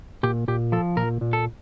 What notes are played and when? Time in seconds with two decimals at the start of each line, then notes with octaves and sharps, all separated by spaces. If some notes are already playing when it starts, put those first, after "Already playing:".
0.23 A#2 G4
0.48 A#2 G4
0.72 F3 A4
0.97 A#2 A#4
1.21 A#2
1.33 A4